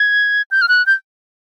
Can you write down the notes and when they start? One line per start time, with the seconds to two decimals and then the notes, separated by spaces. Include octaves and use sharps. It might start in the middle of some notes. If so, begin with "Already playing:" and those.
Already playing: G#6
0.51 G6
0.62 F6
0.68 F#6
0.86 G6